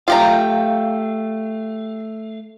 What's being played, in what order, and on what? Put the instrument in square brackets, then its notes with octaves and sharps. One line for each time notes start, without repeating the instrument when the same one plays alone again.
[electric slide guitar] A3 F5 [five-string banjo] F4 G4 A#5